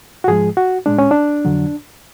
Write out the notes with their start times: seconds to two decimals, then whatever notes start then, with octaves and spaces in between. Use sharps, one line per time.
0.24 F#4
0.28 G#2 F3 G#3 G#4
0.57 F#4
0.86 A2 G#3 D4
0.99 C#4
1.11 D4
1.45 F2 D3 F#3